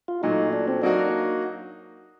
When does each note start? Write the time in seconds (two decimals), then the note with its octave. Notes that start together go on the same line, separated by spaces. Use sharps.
0.08 F4
0.23 A#2 F#3 A3 D#4
0.53 D4
0.68 C4
0.82 F#3 A#3 D4 D#4 F#4